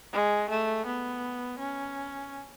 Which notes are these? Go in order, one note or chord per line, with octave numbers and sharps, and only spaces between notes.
G#3
A3
B3
C#4